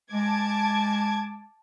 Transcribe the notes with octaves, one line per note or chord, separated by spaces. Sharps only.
G#3 A5 D6 G#6